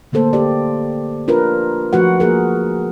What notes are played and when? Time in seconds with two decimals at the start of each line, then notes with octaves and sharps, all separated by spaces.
0.12 D3 A3 A#3 A4 C5
0.33 G4 D5
1.28 D4 F4 A#4 B4
1.93 F3 A3 F#4 B4 F#5
2.20 A#3 G#4 A#4